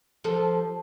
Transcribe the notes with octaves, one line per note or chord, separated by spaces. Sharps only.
F3 A4